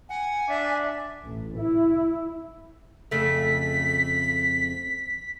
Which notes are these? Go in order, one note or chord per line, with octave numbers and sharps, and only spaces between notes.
F#5 G#5
D4 E5
A1
E4
F2 C#3 A3 B6